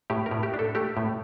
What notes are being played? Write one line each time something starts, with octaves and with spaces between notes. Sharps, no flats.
A2 G4
A#4
A2
G4
D4
A4
A3 G4
A2